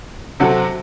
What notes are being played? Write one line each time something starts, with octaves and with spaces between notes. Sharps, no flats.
C3 F#3 C4 F#4 A4